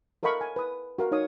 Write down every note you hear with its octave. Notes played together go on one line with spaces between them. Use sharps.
A4 A#4 D#5 F5 B5 C#6
G#5
B4 D#6
F#4 A#4 F5
D#4 C#5 F5 D#6